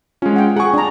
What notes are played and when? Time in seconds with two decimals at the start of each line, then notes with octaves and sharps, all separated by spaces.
0.22 G#3 C#4 F4
0.36 F#5 G5
0.56 G#4 F#5 G#5 C#6
0.74 D4 A#5